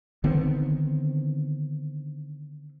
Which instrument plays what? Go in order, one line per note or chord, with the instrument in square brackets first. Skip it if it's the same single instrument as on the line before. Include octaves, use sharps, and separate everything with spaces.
[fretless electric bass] D3 D#3 B3 C4